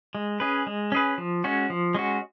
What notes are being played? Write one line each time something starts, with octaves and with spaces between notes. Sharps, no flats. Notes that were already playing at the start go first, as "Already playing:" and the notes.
G#3
C#4 G#4 B4
G#3
C#4 G#4 B4
F3
G#3 C#4 F#4
F3
G#3 C#4 F#4